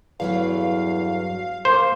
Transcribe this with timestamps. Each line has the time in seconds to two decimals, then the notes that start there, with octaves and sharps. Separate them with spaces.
0.20 E2 G2 F#3 A3 F5
1.65 A#3 C5